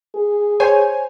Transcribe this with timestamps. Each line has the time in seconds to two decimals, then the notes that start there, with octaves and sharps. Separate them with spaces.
0.15 G#4
0.60 C5 C#5 G#5